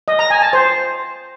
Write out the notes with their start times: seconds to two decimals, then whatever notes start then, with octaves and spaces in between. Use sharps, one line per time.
0.08 D#5
0.19 A#5
0.30 G#5
0.42 A5
0.53 C5